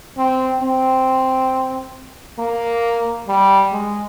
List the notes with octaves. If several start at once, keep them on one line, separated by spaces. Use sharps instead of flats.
C4
C4
A#3
G3
G#3